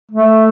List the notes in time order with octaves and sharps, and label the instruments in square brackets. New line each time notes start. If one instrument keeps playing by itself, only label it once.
[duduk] A3